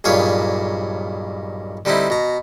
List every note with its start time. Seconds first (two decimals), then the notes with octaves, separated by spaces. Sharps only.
0.04 B1 G2 A#2 G#4 C#5 F5
1.85 D3 G3 C4 D#4 E4
2.10 B2 A#5